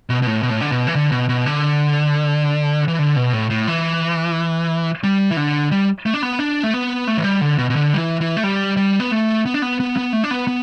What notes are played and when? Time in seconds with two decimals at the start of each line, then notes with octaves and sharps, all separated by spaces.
0.10 B2
0.22 B2
0.27 A2
0.43 B2
0.50 A2
0.61 D3
0.72 B2
0.87 E3
0.95 D3
1.12 B2
1.29 B2
1.46 D3
2.88 E3
2.99 D3
3.16 B2
3.33 A2
3.50 A2
3.67 E3
5.04 G3
5.31 E3
5.37 D3
5.71 G3
6.06 A3
6.14 D4
6.22 B3
6.39 D4
6.63 A3
6.74 B3
7.07 A3
7.18 E3
7.24 G3
7.41 D3
7.58 B2
7.70 B2
7.76 D3
7.94 G3
7.97 E3
8.21 E3
8.37 A3
8.43 G3
8.77 G3
9.00 B3
9.12 A3
9.46 B3
9.54 D4
9.62 B3
9.80 B3
9.97 B3
10.13 A3
10.24 D4
10.31 B3
10.47 B3